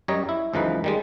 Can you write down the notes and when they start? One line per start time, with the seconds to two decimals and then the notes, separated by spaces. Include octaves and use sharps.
0.08 F#2 G3 C#5 D#5 A#5
0.29 E4
0.53 C#2 F#2 E3 F3 D#4 B4
0.84 D#3 G3 G#3